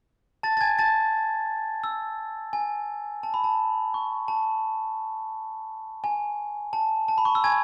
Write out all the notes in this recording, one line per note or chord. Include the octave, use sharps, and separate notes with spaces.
A5 A6
A6
G#5 G#6
A5 A6
E6
G#5
A5
B5
A5
C#6
A5
G#5
A5
A5
B5
C#6
E6
G#5 G#6